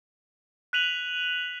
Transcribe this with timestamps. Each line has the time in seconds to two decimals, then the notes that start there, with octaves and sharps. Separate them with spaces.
0.73 F#6 B6 D#7 F7 F#7